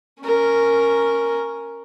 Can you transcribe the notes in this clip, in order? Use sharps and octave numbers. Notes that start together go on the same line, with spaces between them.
C#4 A#4